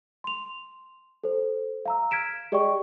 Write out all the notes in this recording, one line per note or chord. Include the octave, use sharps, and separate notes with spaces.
C6 F7
A4 C5
F5 A#5 E6
F6 G#6 B6 D7 E7
G4 G#4 D5 D#5 G5 C#6